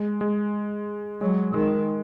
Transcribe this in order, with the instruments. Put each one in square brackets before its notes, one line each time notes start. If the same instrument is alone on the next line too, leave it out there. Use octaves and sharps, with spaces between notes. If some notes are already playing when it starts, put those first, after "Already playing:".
Already playing: [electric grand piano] G#3
G#3
[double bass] F#3 [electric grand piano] G#3
[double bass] D#3 [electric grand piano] G#3